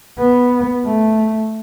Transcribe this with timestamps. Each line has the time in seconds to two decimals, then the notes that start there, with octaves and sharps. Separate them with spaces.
0.18 B3
0.85 A3